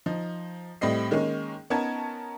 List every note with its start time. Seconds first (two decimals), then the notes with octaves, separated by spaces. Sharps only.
0.06 F3 D#4
0.81 A2 G3 C4 D#5 C7
1.11 D#3 G#3 A#3 C#4 D#4
1.70 B3 C#4 D#4 A#4 A5 G#6